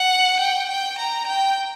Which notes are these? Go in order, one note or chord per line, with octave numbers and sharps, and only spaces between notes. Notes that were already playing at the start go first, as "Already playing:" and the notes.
Already playing: F#5
G5
G5
A#5
G5